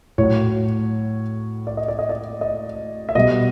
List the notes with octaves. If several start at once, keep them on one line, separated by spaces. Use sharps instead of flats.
A2 F#3 C#5
D5
D#5
D5
D#5
D5
D#5
E5
B2 G3 D#5